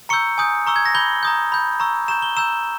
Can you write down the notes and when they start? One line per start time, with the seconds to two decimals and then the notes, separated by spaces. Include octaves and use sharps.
0.09 A#5 C#6 E6 G6 C#7
0.38 G#5 D#6 G6
0.66 A#5 C#6 E6
0.76 G#6
0.85 A#6
0.95 B5 G6 G7
1.23 A#5 D#6 G6
1.52 B5 G6
1.80 A#5 C#6 E6
2.08 A#5 C#6 G6 E7
2.22 G7
2.37 A#5 E6 G6 E7